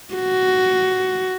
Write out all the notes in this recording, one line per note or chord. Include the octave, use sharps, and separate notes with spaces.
F#4